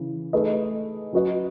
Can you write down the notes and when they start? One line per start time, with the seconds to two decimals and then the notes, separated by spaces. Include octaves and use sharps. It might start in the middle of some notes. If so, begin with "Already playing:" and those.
Already playing: C#3 E3
0.33 A3 D#4 G#4 B4 D#5
1.13 F#3 C#4 F#4 B4 D#5